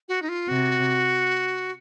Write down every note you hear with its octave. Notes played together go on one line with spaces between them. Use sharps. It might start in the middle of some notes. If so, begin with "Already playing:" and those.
F#4
D#4
F4
C3 F#4